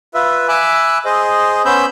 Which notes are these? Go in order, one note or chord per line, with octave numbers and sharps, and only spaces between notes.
F4 B4 E5
E5 G#5 B5 D6 E6 F#6
G#4 C5 D#5
B3 C#4 C5 B5 E6 G6